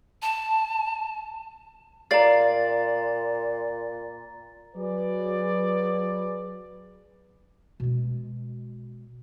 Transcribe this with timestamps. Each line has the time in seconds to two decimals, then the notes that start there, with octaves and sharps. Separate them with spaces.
0.22 A5
2.11 A#2 D5 F5 A#5 A6
4.75 F#3 G#4 B4 D5
7.80 B2 G#3